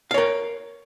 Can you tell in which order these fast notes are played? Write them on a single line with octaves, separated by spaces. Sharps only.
F5 C#5 A#4